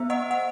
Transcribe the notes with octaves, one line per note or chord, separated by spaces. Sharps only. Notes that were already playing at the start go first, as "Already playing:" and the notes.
Already playing: B3 C5 E5
D#5 F#5
F#5